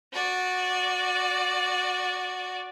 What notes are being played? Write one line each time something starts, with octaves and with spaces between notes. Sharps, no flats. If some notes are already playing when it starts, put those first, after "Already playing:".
F#4 D5